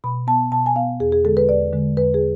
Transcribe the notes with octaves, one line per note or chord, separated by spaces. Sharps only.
B2 B5
B3 A5
B2 A5
G#5
B3 F5
E2 G#4
G#4
D3 G#3 A4
B4
E2 D5
D3 G#3
E2 B4
G#4